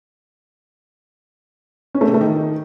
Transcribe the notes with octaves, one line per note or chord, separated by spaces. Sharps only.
C#4
A3
C3
A3
D#3